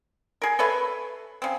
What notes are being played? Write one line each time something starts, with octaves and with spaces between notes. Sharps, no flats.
G#4 A#4
A4 B4 C#5 E5
C#3 C4